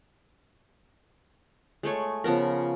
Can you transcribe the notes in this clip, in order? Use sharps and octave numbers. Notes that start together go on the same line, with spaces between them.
G#3 A3 C#5
C#3 F3 B3 A#4